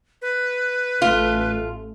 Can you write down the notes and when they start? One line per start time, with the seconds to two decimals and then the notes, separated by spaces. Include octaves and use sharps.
0.22 B4
1.02 A1 A3 F4